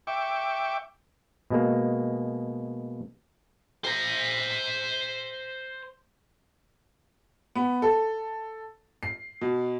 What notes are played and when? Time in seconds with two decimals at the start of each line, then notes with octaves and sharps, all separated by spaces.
0.07 E5 G5 C#6 D6
1.50 B2 G#3 A#3
3.84 C5 A#5
7.55 B3
7.82 A4
9.03 C7
9.41 B2